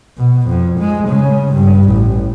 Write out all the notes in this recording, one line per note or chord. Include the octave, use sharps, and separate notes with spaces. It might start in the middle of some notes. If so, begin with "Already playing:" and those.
B2
F2
G#3
C#3
G2
A1